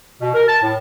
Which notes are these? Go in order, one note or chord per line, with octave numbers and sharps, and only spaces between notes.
B2
A#4
A5
A2